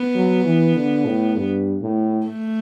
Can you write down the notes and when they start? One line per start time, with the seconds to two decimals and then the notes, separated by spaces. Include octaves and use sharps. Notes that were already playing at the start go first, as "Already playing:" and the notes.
Already playing: B3
0.15 F#3
0.44 E3
0.76 D3
1.05 A2
1.36 G2
1.81 A2
2.27 A3